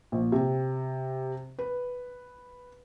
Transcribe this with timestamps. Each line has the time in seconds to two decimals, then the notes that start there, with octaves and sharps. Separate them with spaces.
0.12 A#1
0.32 C3
1.59 B4